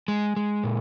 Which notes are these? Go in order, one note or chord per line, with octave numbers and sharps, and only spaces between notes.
G#3
G#3
A#2